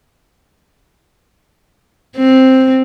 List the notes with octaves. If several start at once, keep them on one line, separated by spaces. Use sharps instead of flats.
C4